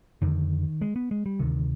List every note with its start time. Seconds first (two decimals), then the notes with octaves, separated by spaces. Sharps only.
0.22 F2 D3 D#3
0.81 G#3
0.96 B3
1.11 G#3
1.26 G3
1.39 D2 C3 D#3